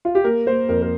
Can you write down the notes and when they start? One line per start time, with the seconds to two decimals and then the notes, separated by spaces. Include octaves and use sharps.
0.05 F4
0.15 G4
0.24 A#3 A#4
0.46 A#3 C5
0.69 F2 A#4
0.82 A#4